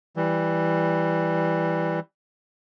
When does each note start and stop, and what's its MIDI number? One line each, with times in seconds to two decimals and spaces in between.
0.16 2.00 52
0.16 2.00 55